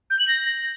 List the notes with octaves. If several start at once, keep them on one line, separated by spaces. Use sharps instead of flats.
G6
F#7
A#6